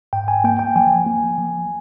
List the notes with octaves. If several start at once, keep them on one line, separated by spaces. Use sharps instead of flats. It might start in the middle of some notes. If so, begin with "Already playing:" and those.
G#2 G5
G#5
A#3 G5
G5
F3 G#5
A#3
F3